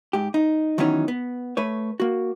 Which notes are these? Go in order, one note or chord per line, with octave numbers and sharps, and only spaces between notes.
G#2 G4
D#4
D#3 E3 F#3 B3 C#4 D#4
B3
A3 B4 C#5
A#3 F#4